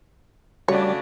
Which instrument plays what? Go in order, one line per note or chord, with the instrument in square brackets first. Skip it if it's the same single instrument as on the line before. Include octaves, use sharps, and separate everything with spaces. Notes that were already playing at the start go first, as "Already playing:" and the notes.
[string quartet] C#3 A3 D4 [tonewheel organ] G3 [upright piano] F#4 [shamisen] C#5